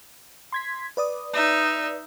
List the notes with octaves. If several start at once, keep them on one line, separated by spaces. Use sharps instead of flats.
C6 G#6 B6
B4 D5 D#6
D#4 E5